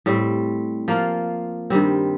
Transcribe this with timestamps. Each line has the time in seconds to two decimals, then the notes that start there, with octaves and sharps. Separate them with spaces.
0.06 A2 G3 C4
0.88 F3 A#3 F4
1.70 G2 D#3 G3 C4